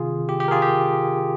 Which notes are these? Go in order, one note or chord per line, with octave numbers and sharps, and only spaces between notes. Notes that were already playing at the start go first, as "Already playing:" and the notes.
Already playing: C3 D#3 F4 G#4
G4
G4
A#4
F4 G#4
G4